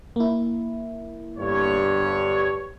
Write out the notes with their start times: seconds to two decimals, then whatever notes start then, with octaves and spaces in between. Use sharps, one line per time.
0.16 A#3 E4
1.37 G1 G2 C#5